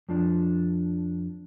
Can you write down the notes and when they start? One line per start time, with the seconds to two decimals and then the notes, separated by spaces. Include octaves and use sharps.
0.09 F2 F3 D4